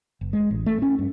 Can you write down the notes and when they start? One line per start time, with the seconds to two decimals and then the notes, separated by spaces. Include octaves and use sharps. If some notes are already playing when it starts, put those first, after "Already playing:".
0.21 F#1
0.33 G#3
0.51 A1
0.66 A3
0.82 C#4
0.99 G2